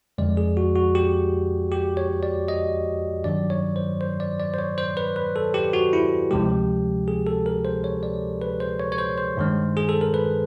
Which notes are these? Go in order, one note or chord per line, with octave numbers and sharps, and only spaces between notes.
F2 D3 F3 G#3 D5
G#4
F#4
F#4
G4
G4
C#5
D5
D#5
G2 D#3 F#3 D5
C#5
C5
C5
D5
D5
C5
C#5
C5
B4
B4
A4
G4
F#4
E4
D2 C3 F3 G#3 G4
G#4
A4
A#4
C5
C#5
D5
B4
C5
C#5
C#5
C5
C5
G2 D#3 G#3
G#4
A4
A#4
B4